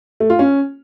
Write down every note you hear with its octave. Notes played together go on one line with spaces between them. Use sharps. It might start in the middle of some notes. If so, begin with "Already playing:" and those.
A3
F4
C#4